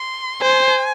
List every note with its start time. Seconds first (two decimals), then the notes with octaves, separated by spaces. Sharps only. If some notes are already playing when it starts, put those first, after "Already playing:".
Already playing: C6
0.41 C5 G#5